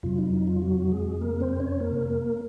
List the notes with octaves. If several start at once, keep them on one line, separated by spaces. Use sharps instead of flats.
F2 C3 F#3 F4
D#4
D#4
F4
F#3 F#4
G#3 G#4
A#3 A#4
C4 C5
C#4 C#5
A#3 A#4
A#3 A#4